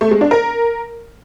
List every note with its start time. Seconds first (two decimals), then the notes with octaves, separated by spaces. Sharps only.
0.01 A3
0.11 G#3
0.21 D4
0.31 A#4